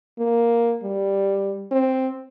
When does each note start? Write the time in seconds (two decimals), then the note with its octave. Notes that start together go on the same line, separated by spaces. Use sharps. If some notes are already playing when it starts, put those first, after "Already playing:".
0.19 A#3
0.83 G3
1.71 C4